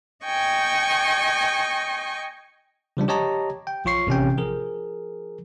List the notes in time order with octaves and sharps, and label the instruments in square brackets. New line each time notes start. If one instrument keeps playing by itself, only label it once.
[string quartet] D#5 G5 G#5 C#6
[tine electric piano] C#3 F3 G3 D4
G4 C#5 D#5 A5 A#5
G5
A#1 F3 F4 C#5 C#6 C7
A1 C3 C#4 G5
F3 G#4 A#4